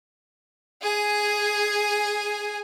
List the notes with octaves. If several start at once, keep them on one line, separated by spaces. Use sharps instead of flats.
G#4 G#5